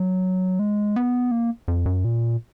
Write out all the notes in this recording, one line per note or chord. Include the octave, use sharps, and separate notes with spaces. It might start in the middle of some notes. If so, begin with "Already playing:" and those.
Already playing: F#3
G#3
B3
A#3
F2
F#2
A#2